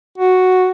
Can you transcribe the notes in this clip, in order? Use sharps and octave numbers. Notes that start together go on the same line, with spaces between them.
F#4